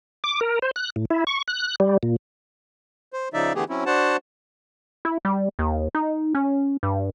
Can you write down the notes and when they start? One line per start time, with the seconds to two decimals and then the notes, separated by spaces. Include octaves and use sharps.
0.24 D6
0.41 A#4
0.62 C5
0.76 F#6
0.96 A2
1.10 E4
1.27 C#6
1.48 F#6
1.80 G3
2.03 A#2
3.13 C5
3.34 C#3 F3 D#4 D5 E5
3.55 D3 E3 A3 B3 G4 G#4
3.69 F#3 C4 C#4 E4
3.86 D4 F#4 C5 F#5 A5
5.05 E4
5.25 G3
5.59 D#2
5.95 D#4
6.35 C#4
6.83 G2